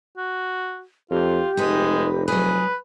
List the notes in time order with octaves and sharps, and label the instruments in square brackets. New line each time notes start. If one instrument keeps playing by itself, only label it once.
[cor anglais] F#4
[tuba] F2 [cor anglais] F4 [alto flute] G4
[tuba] F1 [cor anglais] G#3 [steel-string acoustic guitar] D#4 B4
[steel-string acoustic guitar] F#3 G#4 [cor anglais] B4